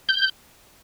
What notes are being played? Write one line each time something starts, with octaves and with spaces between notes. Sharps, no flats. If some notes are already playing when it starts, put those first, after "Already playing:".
G6